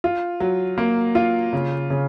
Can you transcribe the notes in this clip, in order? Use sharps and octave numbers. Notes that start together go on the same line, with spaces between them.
F4
F#3
A#3
F4
C#3
C#3